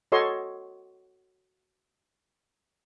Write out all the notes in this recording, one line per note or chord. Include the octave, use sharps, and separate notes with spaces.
F#4 A4 C#5 D#5 C6